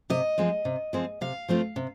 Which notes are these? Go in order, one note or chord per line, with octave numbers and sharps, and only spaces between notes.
C3 D#5
F3 G#3 C4
C3
F3 G#3 C4
C3 F5
F3 A3 C4 F4
C3